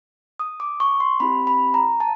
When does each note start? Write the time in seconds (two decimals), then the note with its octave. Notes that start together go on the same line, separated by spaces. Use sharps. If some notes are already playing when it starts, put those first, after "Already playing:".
0.40 D#6
0.60 D6
0.80 C#6
1.00 C6
1.20 C4 E4 G4 B5
1.47 B5
1.74 A#5
2.00 A5